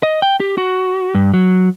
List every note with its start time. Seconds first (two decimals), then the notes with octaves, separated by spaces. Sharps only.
0.03 D#5
0.22 G5
0.40 G4
0.58 F#4
1.15 G2
1.34 F#3